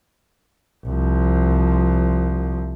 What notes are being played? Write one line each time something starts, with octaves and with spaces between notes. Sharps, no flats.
C2 F3